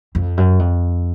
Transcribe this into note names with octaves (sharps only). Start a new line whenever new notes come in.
F2
F#2
F2